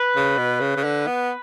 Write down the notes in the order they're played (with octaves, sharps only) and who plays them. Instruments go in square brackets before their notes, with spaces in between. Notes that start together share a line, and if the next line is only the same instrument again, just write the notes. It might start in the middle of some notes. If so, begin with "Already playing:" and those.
Already playing: [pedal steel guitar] B4
[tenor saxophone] C#3
B2
C#3
C#3
D3
B3